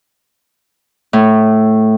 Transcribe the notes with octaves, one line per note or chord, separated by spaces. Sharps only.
A2